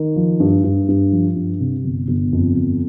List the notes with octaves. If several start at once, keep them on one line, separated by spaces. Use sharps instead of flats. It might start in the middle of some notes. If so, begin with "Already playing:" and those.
Already playing: D#3
F3
G2
G2
G2
F3
G2
C3
G1
G1
F2
G1